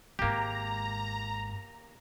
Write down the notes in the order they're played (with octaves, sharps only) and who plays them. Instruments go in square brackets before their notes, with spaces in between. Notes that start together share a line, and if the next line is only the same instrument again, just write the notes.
[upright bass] G#1 G#2 [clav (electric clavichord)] A#3 G4 [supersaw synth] A#5